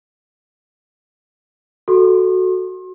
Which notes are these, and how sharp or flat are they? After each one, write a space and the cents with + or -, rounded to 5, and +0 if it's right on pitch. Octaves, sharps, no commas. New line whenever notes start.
F#4 +0 A4 +0 C6 +35